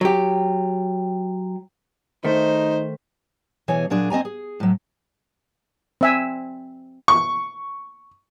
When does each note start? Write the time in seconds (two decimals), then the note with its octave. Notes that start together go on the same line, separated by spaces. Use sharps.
0.01 F#3 G4
2.25 D#3 A3 D#4 C5
3.68 B2 E3 G#4 C#5 G#5
3.90 A#2 F#3 D4 G#4
4.10 C4 D#5 G#5 A#5
4.25 G#4
4.60 A2 F#3
6.01 C4 E5 G#5
7.08 C#6